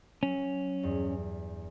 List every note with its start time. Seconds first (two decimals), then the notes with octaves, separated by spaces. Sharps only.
0.23 F#3 C#4
0.83 E2 G2